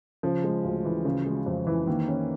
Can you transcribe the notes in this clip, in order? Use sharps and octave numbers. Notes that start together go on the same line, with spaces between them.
C#3 F3
G#3
D2
E3
C#3
G#3
F2
E3
D#3 A#3
C#4